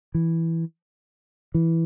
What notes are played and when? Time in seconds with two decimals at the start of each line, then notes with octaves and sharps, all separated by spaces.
0.14 E3
1.54 E3